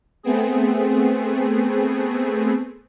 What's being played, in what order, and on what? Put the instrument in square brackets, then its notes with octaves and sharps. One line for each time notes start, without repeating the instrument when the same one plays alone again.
[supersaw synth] A3 B3 C4 G#4